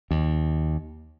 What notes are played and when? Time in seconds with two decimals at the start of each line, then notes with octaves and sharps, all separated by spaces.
0.11 D#2